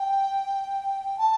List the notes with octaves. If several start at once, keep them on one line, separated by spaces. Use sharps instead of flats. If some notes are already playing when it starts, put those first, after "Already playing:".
Already playing: G5
A5